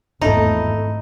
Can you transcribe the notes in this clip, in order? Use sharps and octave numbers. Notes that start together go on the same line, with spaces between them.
G#1 E2 G#2 A3 D#4 E4 A4